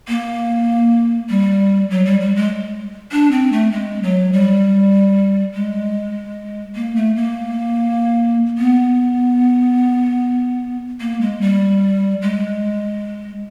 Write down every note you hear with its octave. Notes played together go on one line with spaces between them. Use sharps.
A#3
G3
F#3
G3
G3
G#3
D4
C4
A3
G#3
F#3
G3
G#3
A#3
A3
A#3
B3
A#3
G#3
G3
G#3